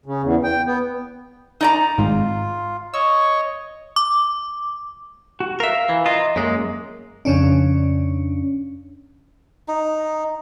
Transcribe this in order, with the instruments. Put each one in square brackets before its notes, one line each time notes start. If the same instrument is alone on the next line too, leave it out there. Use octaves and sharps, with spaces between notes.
[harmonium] C#3
E2
G5
B3
[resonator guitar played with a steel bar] D#4 D5 A#5
[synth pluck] G#1 G#2 [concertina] F4
[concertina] C#5 D#5 C#6 [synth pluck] E6
[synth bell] D6
[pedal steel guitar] F#4
[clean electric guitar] A#4 E5 [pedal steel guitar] F5
[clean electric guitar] E3
[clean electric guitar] F4 [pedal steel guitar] D#5 E5 A#5
[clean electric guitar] F#2 G#3 [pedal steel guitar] A#3
[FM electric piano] F2 C#3 C#4 D4
[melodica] D#4